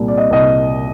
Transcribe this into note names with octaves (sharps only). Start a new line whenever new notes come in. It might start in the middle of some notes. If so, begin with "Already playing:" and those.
Already playing: C2 A#2 G3
D5
D#5
C2 D#5